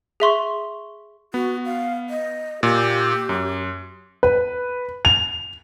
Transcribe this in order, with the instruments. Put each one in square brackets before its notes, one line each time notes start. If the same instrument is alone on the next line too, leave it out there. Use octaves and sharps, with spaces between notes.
[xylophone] G#4 E5 C6 C#6
[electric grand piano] B3 [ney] F#4
[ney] F5
D#5
[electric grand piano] A#2 [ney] G4
[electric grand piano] F#2
[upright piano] B4
F7